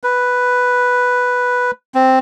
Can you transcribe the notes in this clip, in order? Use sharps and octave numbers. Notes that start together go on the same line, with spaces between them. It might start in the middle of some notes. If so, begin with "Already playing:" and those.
B4
C4